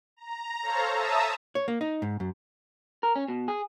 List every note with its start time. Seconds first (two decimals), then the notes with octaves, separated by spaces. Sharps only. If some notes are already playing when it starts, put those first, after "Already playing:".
0.17 A#5
0.62 A4 C5 C#5 F5 A5 A#5
0.93 E5 A5 A#5 D#6 E6
1.55 C#5
1.68 A#3
1.81 D#4
2.02 G#2
2.20 F#2
3.03 A#4
3.16 C#4
3.28 B2
3.48 G#4